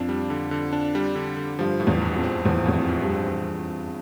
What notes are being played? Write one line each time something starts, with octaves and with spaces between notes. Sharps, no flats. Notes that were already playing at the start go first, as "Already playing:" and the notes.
Already playing: F2 D4
G3
D3
D3
D4
G3
D3
D3
G2 F3
A2
E2
A#1
F2
C4
E2 F3
E2 A2
F2
A#1
G2
C4